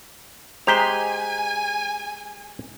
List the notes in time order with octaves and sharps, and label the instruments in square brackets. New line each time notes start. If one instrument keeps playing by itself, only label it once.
[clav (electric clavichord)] G#3 G4 C5 [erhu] G#5 [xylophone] A#5 B6 G7